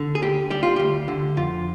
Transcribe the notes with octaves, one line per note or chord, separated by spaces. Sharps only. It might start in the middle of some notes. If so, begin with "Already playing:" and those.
Already playing: D3
G#4
D2 G4
G3 G4
F4
D2 G4
D3
F2 F4